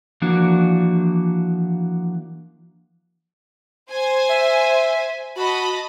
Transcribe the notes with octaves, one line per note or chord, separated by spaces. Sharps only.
E3 F3 A#3 D4 F#4
C5 G#5
E5
F#4 D#5 A5 B5